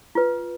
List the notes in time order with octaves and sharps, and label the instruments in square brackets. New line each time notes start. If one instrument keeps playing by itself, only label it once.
[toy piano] F4 B4